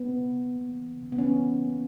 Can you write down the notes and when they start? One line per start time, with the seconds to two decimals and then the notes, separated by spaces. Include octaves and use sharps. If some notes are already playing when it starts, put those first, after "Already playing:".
Already playing: B3
0.09 C#3
0.25 C#3
0.40 A#3
0.56 A#3
0.71 E3
0.87 C#3
1.03 C#3
1.12 B3
1.18 E3 C#4
1.34 C#3
1.49 C#3
1.65 A#3